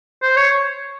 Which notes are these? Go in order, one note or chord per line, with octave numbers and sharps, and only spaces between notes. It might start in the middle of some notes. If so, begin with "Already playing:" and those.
C5
C#5